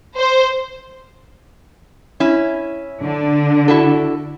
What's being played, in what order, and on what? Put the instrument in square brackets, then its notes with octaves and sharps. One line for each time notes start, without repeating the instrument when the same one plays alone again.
[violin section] C5
[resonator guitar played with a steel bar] C#4 E4
[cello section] D3 D4
[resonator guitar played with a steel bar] E4 F#4 A4